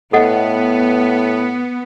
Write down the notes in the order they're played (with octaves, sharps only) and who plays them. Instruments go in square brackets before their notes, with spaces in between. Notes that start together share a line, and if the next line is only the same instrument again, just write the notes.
[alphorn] A2 [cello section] B3 [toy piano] A4 D#5 F#5